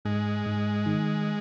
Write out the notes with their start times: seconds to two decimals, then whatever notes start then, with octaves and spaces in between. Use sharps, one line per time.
0.05 G#2 G#3
0.46 G#2
0.86 D#3